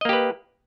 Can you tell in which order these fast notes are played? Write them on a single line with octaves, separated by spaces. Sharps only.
D#5 A#3 G4 B4